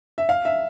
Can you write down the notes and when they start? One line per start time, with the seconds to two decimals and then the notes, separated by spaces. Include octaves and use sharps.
0.18 E5
0.29 F5
0.45 E5